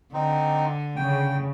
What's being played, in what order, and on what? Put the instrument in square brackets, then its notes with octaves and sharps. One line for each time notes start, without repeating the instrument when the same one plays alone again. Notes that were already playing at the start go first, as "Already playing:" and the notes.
[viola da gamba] D3 [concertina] C4 D#4
[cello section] C#3 [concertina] G5